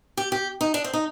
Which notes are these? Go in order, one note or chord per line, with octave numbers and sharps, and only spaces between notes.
G4
G4
D#4
D4
C4
D#4